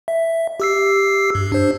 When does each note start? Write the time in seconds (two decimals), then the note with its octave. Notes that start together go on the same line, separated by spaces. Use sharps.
0.08 E5
0.60 G4 E6 C7
1.35 G2
1.52 D4 C5